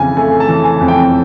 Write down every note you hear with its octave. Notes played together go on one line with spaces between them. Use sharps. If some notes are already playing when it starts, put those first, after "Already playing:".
Already playing: F2 C#3 E3 G#5
A3 G#5
A5
E3
G#5
F2
G5